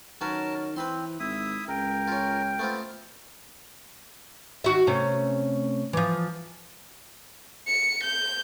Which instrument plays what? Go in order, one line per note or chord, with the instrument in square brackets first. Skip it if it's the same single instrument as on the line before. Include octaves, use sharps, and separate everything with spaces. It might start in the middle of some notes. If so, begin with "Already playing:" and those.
[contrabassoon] D#3 [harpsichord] F#3 C#4 B4 [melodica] A#4 A5
[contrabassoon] E3 [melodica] C4 [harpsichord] B4 B5 C6
[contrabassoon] G#1 [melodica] E4 E5 D#6
[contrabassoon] C#2 [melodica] A#4 [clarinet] G5
[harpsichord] C#4 F4
[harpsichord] A3 C4 F4 [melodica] B3
[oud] D#3 F#4 E5
C3 A3 C#4
E3 F3
[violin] C#7
G6